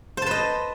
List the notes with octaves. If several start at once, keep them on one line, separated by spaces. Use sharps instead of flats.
B4 C5 D#5 A5